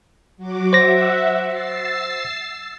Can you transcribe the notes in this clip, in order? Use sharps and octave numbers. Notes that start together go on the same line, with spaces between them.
F#3 F#4 D6
C5 E5 F#5 A#6
E6 A6 C7